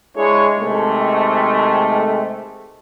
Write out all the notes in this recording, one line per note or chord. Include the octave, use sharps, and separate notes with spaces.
G#3 D4 E4 G#4 C#5
C3 D#3 G#3 A3